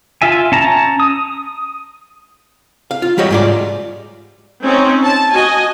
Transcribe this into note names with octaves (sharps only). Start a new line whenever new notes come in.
F4 E5 G#5
C#4 A5 A#5
D#6
F5
F4
G3 F#4 G4 C#5 D#5
G#2 F4 D5
C4 C#4 D#4
A5
F#4 D#5 G#5